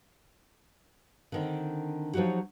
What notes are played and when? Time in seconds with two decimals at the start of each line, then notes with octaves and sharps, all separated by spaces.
1.32 D3 D#3 C4
2.14 F3 F#3 D#4 F#4 G4